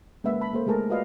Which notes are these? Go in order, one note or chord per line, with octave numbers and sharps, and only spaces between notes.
G#3 A#3 C#4 B4 E5 F#5
A5 B5
A#3 A4 C5
G#3 A3 G#4 A#4 A5 A#5
F4 F#4 B4 D5 D#5 F5